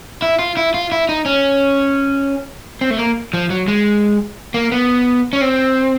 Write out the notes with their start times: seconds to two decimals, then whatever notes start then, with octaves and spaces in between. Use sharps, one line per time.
0.22 E4
0.39 F4
0.57 E4
0.74 F4
0.92 E4
1.09 D#4
1.26 C#4
2.81 C4
2.91 A3
2.99 A#3
3.34 F3
3.50 F#3
3.68 G#3
4.54 A#3
4.72 B3
5.33 C#4
5.41 C4